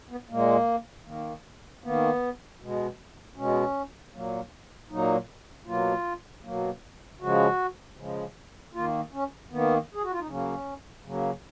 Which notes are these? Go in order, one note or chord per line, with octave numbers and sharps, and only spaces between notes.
B3
A#2 G#3 A#3
D#3 A#3
D#3 A#3 B3
B2 G#3
B2 G#3 C#4
A#2 F#3 A#3
A#2 F#3 A#3 D#4
B2 F#3 A#3 F4
B2 F#3 A#3
C#3 F3 G#3 F#4
C#3 F3 G#3
D#3 A#3 F4
C#4
D#3 A#3 B3
G#4
F#4
F4
D#4
C#3 F#3 A#3 C#4
C#3 F#3 A#3